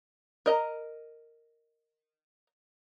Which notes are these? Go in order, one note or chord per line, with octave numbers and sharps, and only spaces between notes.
A#4 D#5 A#5